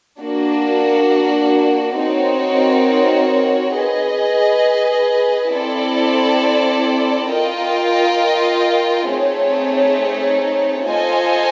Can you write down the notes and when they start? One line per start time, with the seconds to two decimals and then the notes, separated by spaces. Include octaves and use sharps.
0.19 A#3 D4 F#4
1.96 C4 D#4 F#4 A#4 C#5
3.74 G#4 B4 D#5
5.52 C4 E4 A4 D5
7.30 F4 A#4 D#5 G5
9.08 A3 C4 D#4 G#4 C#5
10.86 F4 A4 C5 D#5 G#5